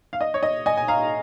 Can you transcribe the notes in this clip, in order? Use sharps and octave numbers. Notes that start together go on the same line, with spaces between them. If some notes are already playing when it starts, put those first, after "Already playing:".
F5
D#5
C#5
D#5
D#5 G#5
G#5
F5 A#5